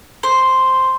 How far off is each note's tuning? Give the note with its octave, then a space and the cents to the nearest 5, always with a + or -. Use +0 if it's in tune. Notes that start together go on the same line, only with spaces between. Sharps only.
C5 +0